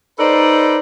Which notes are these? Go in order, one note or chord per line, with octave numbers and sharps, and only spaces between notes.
D#4 A4 B4 C5 D5